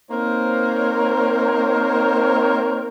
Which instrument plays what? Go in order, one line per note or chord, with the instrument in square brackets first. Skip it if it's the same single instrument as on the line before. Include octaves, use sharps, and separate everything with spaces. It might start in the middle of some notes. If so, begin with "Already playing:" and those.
[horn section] A#3 C4 D#4 A#4 C5 C#5